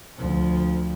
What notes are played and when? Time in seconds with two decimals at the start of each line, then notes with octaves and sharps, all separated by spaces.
0.17 D2 F3